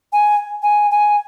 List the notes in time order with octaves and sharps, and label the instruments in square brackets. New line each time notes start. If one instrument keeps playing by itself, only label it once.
[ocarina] G#5
G#5
G#5